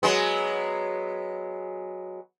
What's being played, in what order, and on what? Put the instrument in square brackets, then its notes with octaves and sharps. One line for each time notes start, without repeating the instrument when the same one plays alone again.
[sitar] F#3 G#3 B3